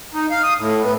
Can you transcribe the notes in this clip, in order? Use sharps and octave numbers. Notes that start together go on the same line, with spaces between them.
D#4
F5
D#6
A2
B3